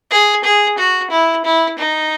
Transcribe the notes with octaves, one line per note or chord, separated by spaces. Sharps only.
G#4
G#4
F#4
E4
E4
D#4